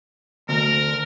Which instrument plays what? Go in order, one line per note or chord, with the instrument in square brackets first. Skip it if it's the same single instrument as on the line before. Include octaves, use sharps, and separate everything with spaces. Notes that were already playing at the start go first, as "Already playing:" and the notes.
[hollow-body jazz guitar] D2 [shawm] A#4